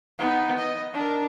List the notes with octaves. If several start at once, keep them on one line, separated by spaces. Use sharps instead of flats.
B3 D#4
D#5
D4 A#4